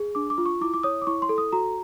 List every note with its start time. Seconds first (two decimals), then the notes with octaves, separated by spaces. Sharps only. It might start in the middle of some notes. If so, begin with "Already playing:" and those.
Already playing: G#4
0.15 D4 D6
0.30 D6
0.38 F4
0.46 C#6
0.61 E4 D6
0.74 D6
0.83 C#5 D#6
1.02 D6
1.07 E4 C#6
1.22 C6
1.29 A4
1.38 D#6
1.52 F#4 A#5